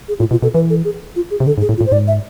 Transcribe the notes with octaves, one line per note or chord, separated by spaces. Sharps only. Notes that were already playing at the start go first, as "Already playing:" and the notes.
G#4
A2 F4
B2 F4
B2 A4
E3 B4
A4
G#4
F4
G#4
C3
D3 A4
G#2
G#4
A2
F4
A2
C5
G#2 D5
E5